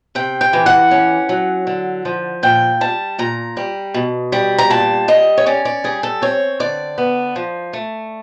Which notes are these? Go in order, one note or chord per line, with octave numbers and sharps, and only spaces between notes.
C3 G5
G5
E3
F#5
C#4
F#3
D3
F3
A#2 G5
G3 A5
A#2 A#5
G3
B2
G3
A#5
A#2 A5
G3 D#5
C#5
C#4 D5
D5
G3 G#4
A4
C4 C#5
D3 D5
B3
F3
A3